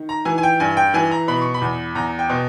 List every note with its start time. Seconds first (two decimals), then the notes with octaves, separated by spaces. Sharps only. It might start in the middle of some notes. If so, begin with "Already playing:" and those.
Already playing: D#3
0.09 A#5
0.25 E3 G#5
0.38 G#5
0.43 G5
0.60 G2 G#5
0.77 G5
0.94 E3 G#5
1.11 A#5
1.28 B2 B5
1.41 C#6
1.54 B5
1.61 E2
1.95 E2 A#5
2.19 G5
2.29 B2